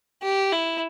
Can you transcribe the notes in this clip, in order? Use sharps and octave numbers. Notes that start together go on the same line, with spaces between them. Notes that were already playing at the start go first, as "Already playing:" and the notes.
G4
E4